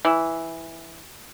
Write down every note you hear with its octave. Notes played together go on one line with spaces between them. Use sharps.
E3